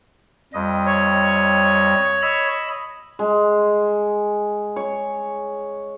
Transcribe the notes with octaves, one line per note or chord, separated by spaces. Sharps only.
F2 G3 D#5
C#5
D#5 B5 E6
G#3
C#5